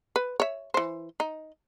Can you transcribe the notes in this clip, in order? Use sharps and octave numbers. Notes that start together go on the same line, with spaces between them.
B4
C#5 E5
E3 C5
D#4